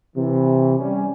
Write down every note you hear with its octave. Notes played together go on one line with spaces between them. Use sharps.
C3 E3
G3 C#4